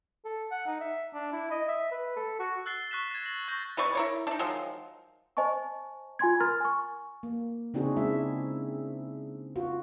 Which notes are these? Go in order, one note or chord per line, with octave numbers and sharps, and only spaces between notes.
A4
F#5
D#4
E5
D4
E4
D#5
E5
B4
A4
F#4
E6 F#6 A6 C7 G7
C#6 F#6 B6 E7
G#6 A6
A#6 F#7
C#6 G6 A#6
C3 B4 D5 C#6
E4 A#4 C#5
D4 D#4
D#3 F3 F#3 G#3
C5 D#5 G#5 A5 C#6
F4 G#5 C6 G#6
A#4 A#5 C6 F6 A6
G#5 C#6
A#3
C#3 C4 D4 D#4 F#4 G#4
G#3 E4 E5
F4 F#4